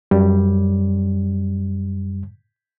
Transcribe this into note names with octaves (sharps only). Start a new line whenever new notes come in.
F#2 G3